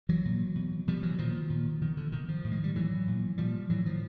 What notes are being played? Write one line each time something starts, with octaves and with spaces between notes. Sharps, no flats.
E3 F#3
A#2
B2
B2 F3 G3
E3 F#3
A#2 D#3 F3
A#2
B2 D#3
D3
B2 D#3
D#3 F3
A2
G#3
G3
A2 E3 F#3
A#2
A#2 F3 G3
A2 E3 F#3
D#3 F3